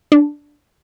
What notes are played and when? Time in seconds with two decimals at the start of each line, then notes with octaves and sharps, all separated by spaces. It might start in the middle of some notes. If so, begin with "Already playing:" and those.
0.12 D4